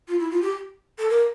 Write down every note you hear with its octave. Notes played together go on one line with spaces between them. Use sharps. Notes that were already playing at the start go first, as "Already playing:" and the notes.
F4
E4
F4
G4
A4
A#4